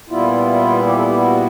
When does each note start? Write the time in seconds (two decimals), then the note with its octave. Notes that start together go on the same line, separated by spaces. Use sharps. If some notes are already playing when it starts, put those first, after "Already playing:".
0.09 A#2 G3 B3 E4 F4
0.87 G4
0.97 A4
1.07 G4
1.17 F#4